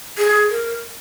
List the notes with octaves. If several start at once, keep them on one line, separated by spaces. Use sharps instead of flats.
G#4
A#4